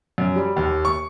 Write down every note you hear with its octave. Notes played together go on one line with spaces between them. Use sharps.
F#2
G3
D#2
C#6